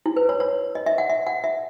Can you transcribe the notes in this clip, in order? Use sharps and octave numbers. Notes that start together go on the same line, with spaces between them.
E4
B4
C#5
C#5
D#5
E5
F#5
E5
F#5
E5